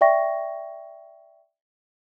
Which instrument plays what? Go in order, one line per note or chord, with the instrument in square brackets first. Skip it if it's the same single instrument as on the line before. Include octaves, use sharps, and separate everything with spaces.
[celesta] D5 E5 G5 C#6 A#6